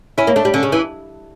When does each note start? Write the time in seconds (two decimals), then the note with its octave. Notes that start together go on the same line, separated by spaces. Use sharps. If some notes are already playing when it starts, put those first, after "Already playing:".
0.18 C#4 E4
0.27 A#3
0.36 A3 D4
0.45 G3
0.54 D3 C#4
0.63 C#3
0.72 E3